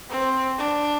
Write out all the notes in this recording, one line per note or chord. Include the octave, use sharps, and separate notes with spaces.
C4
D4